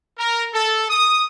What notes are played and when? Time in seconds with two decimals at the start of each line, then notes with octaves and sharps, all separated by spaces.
0.18 A#4
0.54 A4
0.90 D#6